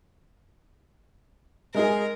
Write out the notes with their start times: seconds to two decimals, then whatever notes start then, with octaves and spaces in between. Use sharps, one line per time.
1.74 G#3 D#4 G#4 A#4